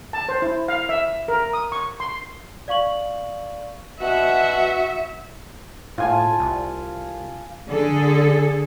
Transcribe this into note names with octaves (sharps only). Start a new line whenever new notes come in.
A5
C5
E4
F5
E5
A#4
D#6
C#6
C6
D5 F5 C#6 F#7
B2 F#4 E5 F#5
A2 F4 G#5 A5
C2
D3 G#4 A4